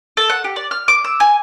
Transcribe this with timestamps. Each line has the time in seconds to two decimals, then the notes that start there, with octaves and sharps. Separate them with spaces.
0.17 A4
0.30 F#5
0.44 G4
0.56 D5
0.71 F6
0.88 D6
1.04 E6
1.20 G#5